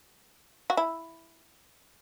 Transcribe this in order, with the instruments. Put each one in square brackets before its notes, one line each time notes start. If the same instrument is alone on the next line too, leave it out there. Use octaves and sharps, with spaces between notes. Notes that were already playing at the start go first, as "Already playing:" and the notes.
[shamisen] F#4
E4